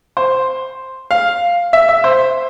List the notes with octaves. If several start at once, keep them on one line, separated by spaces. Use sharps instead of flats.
C5
F5
E5
E5
C5